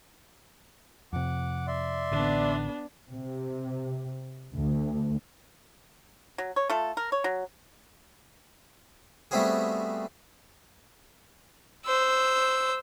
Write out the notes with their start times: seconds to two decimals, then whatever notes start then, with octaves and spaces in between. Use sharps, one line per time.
1.13 F2 C3 F#5 D6
1.67 D5 E5 C6
2.12 A1 D3 B3 D4
3.11 C3
4.56 D2
6.38 F#3
6.56 C#5
6.70 A3 F4 A4
6.97 A#4
7.12 C#5
7.24 F#3
9.31 G3 A3 B3 C4 F#4 G#4
11.86 C5 E6